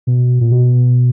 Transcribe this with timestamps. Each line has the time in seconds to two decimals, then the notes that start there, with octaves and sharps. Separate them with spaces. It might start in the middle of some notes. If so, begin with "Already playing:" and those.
0.07 B2
0.41 A#2
0.52 B2